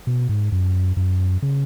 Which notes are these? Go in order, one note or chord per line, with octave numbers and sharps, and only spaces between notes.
B2
G#2
F#2
F#2
C#3